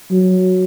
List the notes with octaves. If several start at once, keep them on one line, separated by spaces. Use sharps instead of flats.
F#3